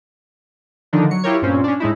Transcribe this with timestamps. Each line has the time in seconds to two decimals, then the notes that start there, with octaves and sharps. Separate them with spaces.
0.93 D3 D#3 F3 D4 D#4
1.11 F#3 C#7
1.24 E4 F4 G4 A#4 C#5
1.42 G2 A#2 C4 C#4
1.64 C#4 D4
1.80 A2 G#3 D#4 E4